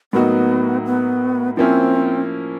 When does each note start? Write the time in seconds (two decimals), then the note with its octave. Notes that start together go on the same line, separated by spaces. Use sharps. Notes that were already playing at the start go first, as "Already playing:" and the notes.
0.13 A2 F#3 A#3 B3 D#4 F#4
0.85 B3
1.57 F3 A#3 C4 C#4 E4